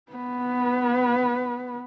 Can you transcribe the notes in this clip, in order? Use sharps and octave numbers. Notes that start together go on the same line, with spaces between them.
B3 B4